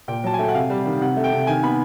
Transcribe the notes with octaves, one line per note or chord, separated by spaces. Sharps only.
A#2 G5
F#3 A5
G#5
A3 G5
F#5
C3 F5
G3
D#3
C3 F#5
A3
G5
C3
D#3 G#5
B3 B5